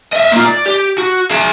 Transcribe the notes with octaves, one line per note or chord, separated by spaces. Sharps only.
D#5 E5
A#3 F4
D5
G4
F#4
G#4 E5